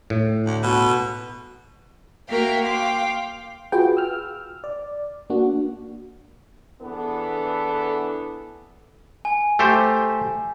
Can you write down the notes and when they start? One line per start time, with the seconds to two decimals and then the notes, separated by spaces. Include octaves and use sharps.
0.10 A2
0.46 D2
0.63 B2
2.30 A#3 F#4 A#4 E5 F5 G5
2.66 F5 G5 C6 D6
3.72 F4 F#4 G#4 B4 G5
3.97 E6 F6
4.64 D5
5.30 A#3 D4 F#4
6.82 E2 E3 B3 D4 A4
9.25 G#5
9.59 A3 G4 C5